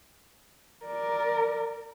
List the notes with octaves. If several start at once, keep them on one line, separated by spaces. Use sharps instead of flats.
A#4 D5